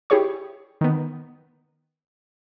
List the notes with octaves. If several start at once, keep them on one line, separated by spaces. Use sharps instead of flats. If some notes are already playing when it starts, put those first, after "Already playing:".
E4 G4 G#4 C#5 C#6
D#3 B3